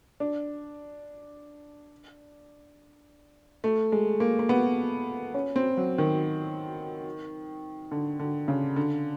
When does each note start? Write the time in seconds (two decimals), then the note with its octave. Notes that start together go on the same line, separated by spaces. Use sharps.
0.20 D4
3.64 A3
3.92 G#3
4.20 A#3
4.39 A#3
4.49 B3
5.34 C#4
5.56 C4
5.77 F#3
5.98 D#3
7.91 D3
8.20 D3
8.48 C#3
8.76 D3